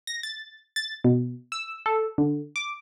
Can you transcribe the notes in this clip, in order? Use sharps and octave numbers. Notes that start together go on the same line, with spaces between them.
A#6
A6
A6
B2
E6
A4
D3
D6